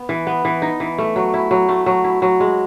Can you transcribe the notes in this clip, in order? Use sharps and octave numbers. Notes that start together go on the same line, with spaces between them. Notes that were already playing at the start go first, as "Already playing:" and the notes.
Already playing: B3
E3
B3
E3
D#4
E3
A3
F#3
E4
F#3
A3
F#3
E4
F#3
G#3